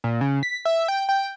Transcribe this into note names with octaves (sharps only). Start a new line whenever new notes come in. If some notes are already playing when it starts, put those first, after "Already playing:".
A#2
C#3
B6
E5
G5
G5